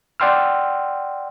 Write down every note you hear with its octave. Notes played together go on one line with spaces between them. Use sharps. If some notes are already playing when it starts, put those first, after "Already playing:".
D5 F#5 G5 C6 E6 F6